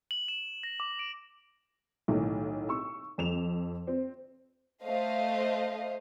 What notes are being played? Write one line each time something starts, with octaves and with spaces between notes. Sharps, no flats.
F#7
E7
A#6
D6
D7
B1 A2 D#3
C#6 E6
F2 E7 F7
C4
A3 C5 D#5 F5